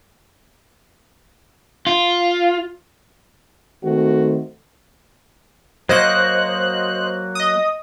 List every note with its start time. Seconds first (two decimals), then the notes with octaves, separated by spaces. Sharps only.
1.87 F4
3.84 D#3 A3 C4 F#4
5.89 F#3 A#3 F#4 C5 D#5 F#6
7.35 D#5 D#6